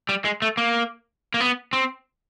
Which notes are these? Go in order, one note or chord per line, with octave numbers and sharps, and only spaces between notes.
G3
G#3
A3
A#3
A#3
B3
C4